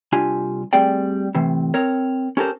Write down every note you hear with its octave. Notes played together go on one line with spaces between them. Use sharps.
C2 D4 F4 G4 G#5
G3 A3 C4 G#4 D5 G5
A2 C3 E3
C4 A#4 C#5
C#4 G4 A4 A#4 C5